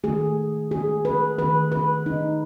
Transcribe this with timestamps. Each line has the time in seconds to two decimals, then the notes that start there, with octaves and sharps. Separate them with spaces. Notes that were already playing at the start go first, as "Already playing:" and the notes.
0.04 D#3 A3 G#4
0.71 G#4
1.05 B4
1.39 D#3 A3 B4
1.72 B4
2.06 D#4